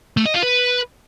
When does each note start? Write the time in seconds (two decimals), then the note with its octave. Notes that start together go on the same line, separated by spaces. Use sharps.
0.17 A3
0.25 D#5
0.34 F4
0.43 B4